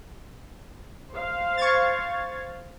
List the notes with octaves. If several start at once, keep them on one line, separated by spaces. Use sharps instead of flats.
C5 F5
C#6 G#6 A6